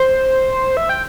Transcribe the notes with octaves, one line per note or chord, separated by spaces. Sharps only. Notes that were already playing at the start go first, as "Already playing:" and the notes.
Already playing: C5
E5
G5